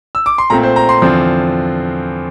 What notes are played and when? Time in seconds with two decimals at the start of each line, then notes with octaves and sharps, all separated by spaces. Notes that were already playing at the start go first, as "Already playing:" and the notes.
0.15 E6
0.26 D6
0.38 C6
0.50 A#2 A3 C4 A#5
0.63 C5
0.76 A#5
0.89 C6
1.02 E2 D3 F3 C4